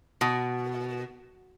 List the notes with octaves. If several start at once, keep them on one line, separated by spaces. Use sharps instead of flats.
B2